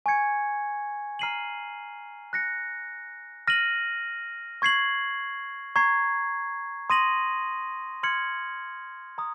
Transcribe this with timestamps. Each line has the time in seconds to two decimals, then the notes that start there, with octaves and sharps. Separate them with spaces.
0.06 G#5 C#6 G#6 C#7
1.19 A#5 F6 C7 D#7 F#7
2.33 F#6 A#6 C#7
3.47 F6 A#6 D#7 F#7
4.62 C#6 G#6 C7 F#7
5.76 A#5 C#6 G#6 C7
6.90 C6 D#6 A#6 D#7 F#7
8.03 C6 F6 G#6 C#7 F#7
9.18 A#5 D#6